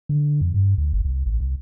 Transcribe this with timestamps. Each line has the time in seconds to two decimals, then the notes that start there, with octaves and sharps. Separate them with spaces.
0.09 D3
0.41 F2
0.54 G2
0.78 D2
0.93 G1
1.05 C2
1.26 A1
1.40 C2